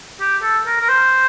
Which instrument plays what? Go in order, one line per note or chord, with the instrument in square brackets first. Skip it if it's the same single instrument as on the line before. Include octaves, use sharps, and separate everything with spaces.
[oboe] G4
A4
A#4
A#4
C5